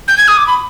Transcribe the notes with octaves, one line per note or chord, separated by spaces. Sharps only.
G6
G#6
D#6
D6
B5